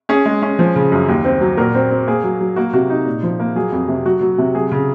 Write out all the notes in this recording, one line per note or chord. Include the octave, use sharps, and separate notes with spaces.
C#4 G#4
G#3
C#4
F3
C#3
F#2
D#2
C4
F#3
A#2 F#4 A#4
C4
C4
A#3 G#4
F#3
F#3
A#3 F#4
C3 F#4
D#4
A#2
F3
A#3
F#3 G#4
F2
C3
F#3 F#4
F#3
C3
F#3 G#4
C#3